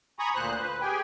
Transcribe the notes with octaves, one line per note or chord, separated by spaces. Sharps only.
G#5 A#5 B5 C#6 D#6
D2 A#2 C5 F#6
B4
G4 G#4 G5 G#5